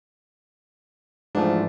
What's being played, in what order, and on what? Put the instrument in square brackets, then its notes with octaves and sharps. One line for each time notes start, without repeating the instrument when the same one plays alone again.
[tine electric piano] G#2 E3 F3 [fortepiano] A3 D4